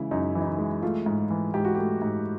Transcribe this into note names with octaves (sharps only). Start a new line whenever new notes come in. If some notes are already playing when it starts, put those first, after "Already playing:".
Already playing: C#3 E3 G#3 E4
F#2 D#4
E3
D#4
E4
G#3
A3 F4
G#2
E3
G#2 G4
F#4
A3 G4
G#2